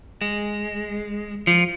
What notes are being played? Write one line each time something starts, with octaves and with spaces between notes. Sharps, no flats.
G#3
F3